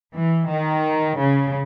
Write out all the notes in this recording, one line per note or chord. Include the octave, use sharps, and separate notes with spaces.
E3
D#3
C#3